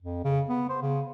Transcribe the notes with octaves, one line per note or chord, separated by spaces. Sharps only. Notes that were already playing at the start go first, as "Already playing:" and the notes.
F2
C#3
B3
C5
C#3